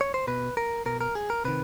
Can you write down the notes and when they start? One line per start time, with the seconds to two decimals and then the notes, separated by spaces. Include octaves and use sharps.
0.01 C#5
0.14 C5
0.27 B2 B4
0.57 A#4
0.86 B2 A#4
1.01 A#4
1.15 G#4
1.30 A#4
1.45 C3 D#3 B4